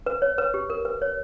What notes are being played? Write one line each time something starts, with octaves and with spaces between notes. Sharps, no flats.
B4
C#5
B4
G4
A#4
B4
C#5